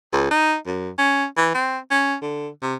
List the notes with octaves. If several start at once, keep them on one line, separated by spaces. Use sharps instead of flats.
C#2
D#4
F#2
C#4
E3
C4
C#4
D3
C3